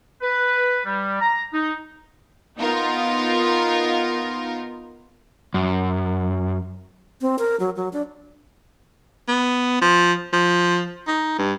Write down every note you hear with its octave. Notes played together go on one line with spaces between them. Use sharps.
B4
G3
A#5
D#4
B3 D#4 F4 A#4
F#2
C4
A#4
F#3
F#3
D4
B3
F3
F3
D#4
G2